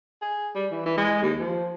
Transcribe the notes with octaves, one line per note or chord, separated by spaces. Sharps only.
G#4
G3
E3
E3
G#3
D#2
F3